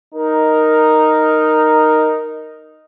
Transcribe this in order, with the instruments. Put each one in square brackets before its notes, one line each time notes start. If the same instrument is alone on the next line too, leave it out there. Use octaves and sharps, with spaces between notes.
[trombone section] D#4 A#4